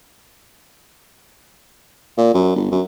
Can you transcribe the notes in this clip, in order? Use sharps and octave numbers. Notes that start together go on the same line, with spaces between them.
A#2
F#2
G1
F#2